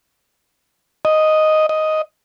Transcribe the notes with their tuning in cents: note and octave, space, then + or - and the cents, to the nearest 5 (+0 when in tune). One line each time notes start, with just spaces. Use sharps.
D#5 +0
D#5 +5